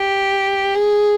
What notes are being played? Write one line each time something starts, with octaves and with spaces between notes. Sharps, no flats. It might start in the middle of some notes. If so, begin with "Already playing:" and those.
Already playing: G4
G#4